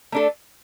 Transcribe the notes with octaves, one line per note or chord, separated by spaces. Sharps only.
A3 D4 A4